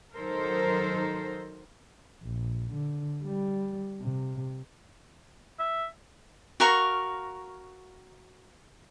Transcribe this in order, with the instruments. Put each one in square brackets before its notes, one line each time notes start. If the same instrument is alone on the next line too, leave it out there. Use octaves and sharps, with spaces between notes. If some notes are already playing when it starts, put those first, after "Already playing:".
[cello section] D#3 F#3 D#4 A4 A#4 C5
[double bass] A#1
D3
G3
C3
[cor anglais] E5
[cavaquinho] F#4 A#4 F5 C#6